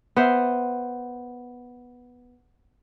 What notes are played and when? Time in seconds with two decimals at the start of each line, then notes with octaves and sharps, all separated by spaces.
0.16 B3 C5 E5